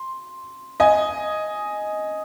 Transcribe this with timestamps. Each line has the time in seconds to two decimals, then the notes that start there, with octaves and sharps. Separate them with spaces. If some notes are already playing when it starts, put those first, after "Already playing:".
Already playing: C6
0.80 D#5 G#5